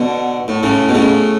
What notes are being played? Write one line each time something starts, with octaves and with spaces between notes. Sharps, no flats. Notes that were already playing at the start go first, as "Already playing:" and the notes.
Already playing: B2 D3
A2
A2 C#3
B2
A2 C#3